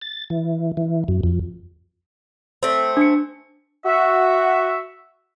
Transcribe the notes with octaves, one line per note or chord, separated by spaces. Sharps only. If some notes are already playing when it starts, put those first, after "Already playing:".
A6
E3
E3
F#2
F2
A3 C4
D4 C#7
F#4 E5